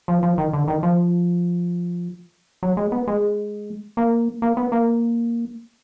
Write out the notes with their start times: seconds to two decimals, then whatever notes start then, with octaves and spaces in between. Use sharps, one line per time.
0.08 F3
0.23 F3
0.38 D#3
0.53 D3
0.68 D#3
0.83 F3
2.63 F#3
2.77 G#3
2.92 B3
3.07 G#3
3.97 A#3
4.42 A#3
4.57 B3
4.72 A#3